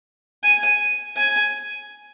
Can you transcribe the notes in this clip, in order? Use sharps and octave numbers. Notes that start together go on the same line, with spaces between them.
G#5
G#5